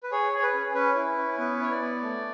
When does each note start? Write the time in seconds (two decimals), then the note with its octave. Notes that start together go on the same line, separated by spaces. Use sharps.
0.03 B4
0.12 G#4 C#5
0.33 G#4 C#5
0.43 B4
0.54 C#4
0.75 C#4 B4
0.96 E4
1.18 C#4
1.38 B3 B4
1.60 E4 C#5
1.71 D5
1.82 B3
2.02 A3